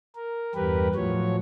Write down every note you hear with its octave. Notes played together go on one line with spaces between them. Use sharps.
A#4
E2 G2 G4 A#4 B4
A2 F3 F#3 C#5